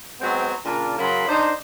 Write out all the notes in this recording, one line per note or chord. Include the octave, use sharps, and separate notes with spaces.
F#3 G#3 B3 C4
A#2 C#3 D4 A#4
F#2 C#3 F#3 A#3 B5 C6
D3 D4 D#4 C5